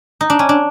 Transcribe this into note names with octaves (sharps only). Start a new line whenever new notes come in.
D#4
D4
C#4
D4